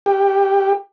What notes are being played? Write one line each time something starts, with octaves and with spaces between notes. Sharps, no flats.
G4